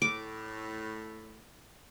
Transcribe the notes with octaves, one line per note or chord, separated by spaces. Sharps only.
A2 D6